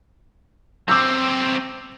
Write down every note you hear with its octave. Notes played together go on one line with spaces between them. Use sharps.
F#3 C4 D6 E6 G6